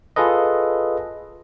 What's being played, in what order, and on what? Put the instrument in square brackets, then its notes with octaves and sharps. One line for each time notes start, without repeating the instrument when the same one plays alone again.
[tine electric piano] F4 G#4 A4 B4 D#5